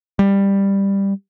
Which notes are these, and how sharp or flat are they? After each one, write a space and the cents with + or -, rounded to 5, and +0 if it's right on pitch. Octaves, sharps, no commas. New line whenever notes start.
G3 +10